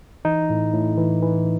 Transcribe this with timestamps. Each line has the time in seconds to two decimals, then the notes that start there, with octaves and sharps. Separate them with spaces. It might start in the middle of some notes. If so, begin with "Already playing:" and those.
0.25 E3 D#4
0.50 A2
0.74 A2
0.97 E3
1.22 E3